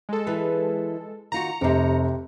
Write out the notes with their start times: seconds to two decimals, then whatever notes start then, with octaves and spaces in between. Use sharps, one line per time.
0.09 G#3 A4
0.27 E3 G#4 B4
1.32 D#3 F4 F#4 A#5 C#7
1.61 F1 C3 G4